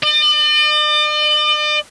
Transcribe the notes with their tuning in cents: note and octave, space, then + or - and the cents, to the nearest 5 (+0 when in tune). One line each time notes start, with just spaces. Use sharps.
D5 +45